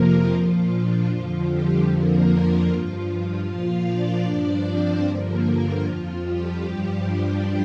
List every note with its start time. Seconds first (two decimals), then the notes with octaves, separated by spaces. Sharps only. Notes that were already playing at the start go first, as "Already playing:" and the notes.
Already playing: F2 C3 F3 A#3 F4 A#4
0.30 A#2 F3 F4
0.69 D4
1.09 F2 D3 F3 F4
1.48 G3 G4
1.88 F2 D3 F3 A#3 A#4
2.27 F4
2.67 G2 F3 F4
3.06 F4
3.46 A#2 F3 F4 F5
3.85 D4 D5
4.25 G2 F3 D4 D5
4.65 C4 C5
5.04 G2 D3 F3 A#3 A#4
5.43 F4
5.83 F2 F3 F4
6.23 G3 G4
6.62 G2 F3 G3 G4
7.02 D4